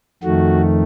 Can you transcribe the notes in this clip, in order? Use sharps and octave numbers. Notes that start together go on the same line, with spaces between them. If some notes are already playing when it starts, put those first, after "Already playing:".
F2 D#3 A3 F#4